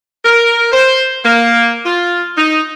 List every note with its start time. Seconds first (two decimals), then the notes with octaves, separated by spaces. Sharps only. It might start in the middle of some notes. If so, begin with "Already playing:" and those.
0.24 A#4
0.72 C5
1.24 A#3
1.85 F4
2.37 D#4